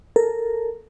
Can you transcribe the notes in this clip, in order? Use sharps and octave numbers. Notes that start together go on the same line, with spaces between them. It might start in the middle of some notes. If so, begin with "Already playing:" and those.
A4 A#4